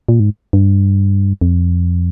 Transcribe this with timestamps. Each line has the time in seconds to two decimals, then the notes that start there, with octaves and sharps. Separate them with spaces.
0.09 A#2
0.20 G#2
0.53 G2
1.41 F2